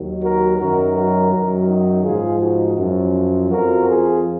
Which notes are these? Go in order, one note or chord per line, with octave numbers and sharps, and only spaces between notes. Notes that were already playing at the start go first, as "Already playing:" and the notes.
Already playing: D#2 D#3 F#3
F#4 A#4
F#2 D#3 F#3 F#4 A#4
F#4 A#4
F#2 D#3 F#3 F#4 A#4
D#4 F#4
G#2 F3 F4 G#4
D#4 F#4
F#2 F3
F2 F3 F#4 A#4
F4 G#4